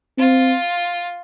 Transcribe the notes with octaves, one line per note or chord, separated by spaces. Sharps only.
C4 F4